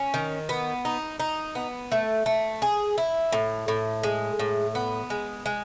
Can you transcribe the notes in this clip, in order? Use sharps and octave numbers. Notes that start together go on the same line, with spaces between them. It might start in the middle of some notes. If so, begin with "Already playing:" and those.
Already playing: C#4
D#3
B3
D#4
D#4
B3
A3
A3
G#4
E4
A2
A2
G#3
A2
B3
G#3
G#3